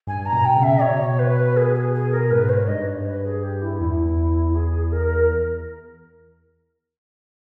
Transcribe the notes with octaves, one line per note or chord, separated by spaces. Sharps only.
G2 G#5
A#5
B2
G5
C#3
E5
B2 C#5
B4
G#4
G#4
G#4
A#4
G#2 B4
C#5
G2 D#5
C#5
B4
G#4
G4
E4
E2 E4
G#4
A#4